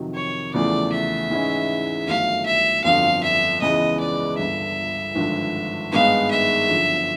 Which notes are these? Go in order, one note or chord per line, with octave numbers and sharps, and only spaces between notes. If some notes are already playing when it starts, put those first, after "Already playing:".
Already playing: F2 C3 D#3 F#3
C#5
E2 C#3 F3 A3 D5
E5
G#2 E3 G#3 C#4 E4
G1 F#2 D#3 F#3 A3 F5
E5
G1 F2 D3 F#3 F5
E5
C#2 C#3 E3 G#3 B3 D#5
D5
G1 G2 D3 E5
G#1 G2 D3 F3
G#1 G2 D#3 G#3 B3 F5
E5
G1 F#2 D3 F3